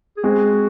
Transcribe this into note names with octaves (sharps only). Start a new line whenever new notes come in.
G#4
G#3 C4 F#4